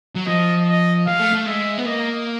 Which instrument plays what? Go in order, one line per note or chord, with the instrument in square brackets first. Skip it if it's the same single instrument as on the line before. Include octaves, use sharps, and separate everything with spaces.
[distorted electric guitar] F#3
[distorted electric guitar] F3 [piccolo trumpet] D#5
[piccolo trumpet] D#5
[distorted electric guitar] G#3 [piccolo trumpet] F5
[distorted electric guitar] A3
A3
[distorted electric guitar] G#3 [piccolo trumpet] E5
[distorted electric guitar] B3
[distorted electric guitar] A#3 [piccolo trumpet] D#5